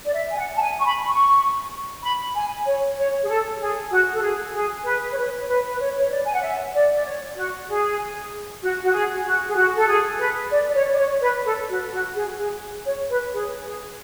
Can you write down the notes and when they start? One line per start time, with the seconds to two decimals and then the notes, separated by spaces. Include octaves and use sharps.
0.06 D5
0.14 E5
0.31 G#5
0.38 F#5
0.57 A5
0.61 G#5
0.80 C#6
0.85 B5
1.09 C#6
2.03 B5
2.35 G#5
2.66 C#5
2.98 C#5
3.23 G#4
3.29 A4
3.60 G#4
3.91 F#4
4.13 A4
4.22 G#4
4.54 G#4
4.85 B4
5.13 C#5
5.18 B4
5.41 C#5
5.49 B4
5.70 B4
5.80 C#5
5.99 C#5
6.11 D5
6.24 G#5
6.34 F#5
6.43 E5
6.74 D5
6.94 D5
7.06 C#5
7.36 F#4
7.68 G#4
8.63 F#4
8.82 F#4
8.93 G#4
9.26 F#4
9.48 G#4
9.57 F#4
9.77 A4
9.88 G#4
10.19 B4
10.51 D5
10.69 D5
10.75 C#5
10.92 D5
10.98 C#5
11.21 B4
11.45 A4
11.69 F#4
11.92 F#4
12.16 G#4
12.39 G#4
12.86 C#5
13.09 B4
13.33 G#4
13.65 G#4